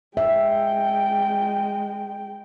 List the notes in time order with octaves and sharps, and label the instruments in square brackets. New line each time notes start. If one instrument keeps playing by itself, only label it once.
[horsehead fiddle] G#3 G5 [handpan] E5